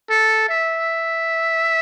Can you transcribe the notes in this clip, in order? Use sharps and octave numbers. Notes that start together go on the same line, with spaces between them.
A4
E5